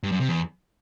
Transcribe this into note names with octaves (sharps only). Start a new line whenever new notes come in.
G2
F#2
C3
E2